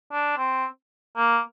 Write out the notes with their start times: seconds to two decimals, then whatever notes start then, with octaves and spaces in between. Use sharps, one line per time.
0.12 D4
0.37 C4
1.17 A#3